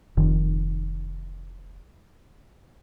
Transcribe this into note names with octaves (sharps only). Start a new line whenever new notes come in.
F1 D#3